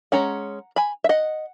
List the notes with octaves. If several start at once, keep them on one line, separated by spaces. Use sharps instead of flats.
G#3 C#4 F#5 A#5
G#5 B5
E5
D#5 F#5